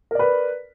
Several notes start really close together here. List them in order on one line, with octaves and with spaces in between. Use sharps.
A#4 D5 B4